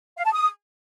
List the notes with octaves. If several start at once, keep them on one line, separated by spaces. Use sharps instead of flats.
F5
A5
D#6